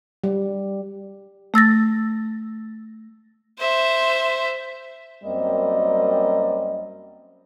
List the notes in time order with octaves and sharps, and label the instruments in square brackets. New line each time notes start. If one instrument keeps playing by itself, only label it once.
[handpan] G3
[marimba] A3 E6 A6 A#6
[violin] C5 E5
[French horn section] F#2 G3 A#3 C4 D#5